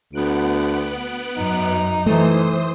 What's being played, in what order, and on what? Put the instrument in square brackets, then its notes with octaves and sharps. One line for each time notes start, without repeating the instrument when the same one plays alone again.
[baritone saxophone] D2 [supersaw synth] B3 F#6 D7
[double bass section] F#2 [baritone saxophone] D#4
[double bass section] E3 [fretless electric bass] A3 [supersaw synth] C5 D#6